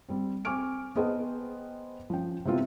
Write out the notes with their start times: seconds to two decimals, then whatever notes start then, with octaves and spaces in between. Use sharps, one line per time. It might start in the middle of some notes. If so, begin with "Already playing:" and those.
0.09 G3 C4
0.45 C4 G#5 C#6 D6 F6 D7
0.96 B3 G#4 C5 D#5 G5 A5
2.10 F3 C#4 G5
2.45 C3 G#3 B3 C4 E4 F4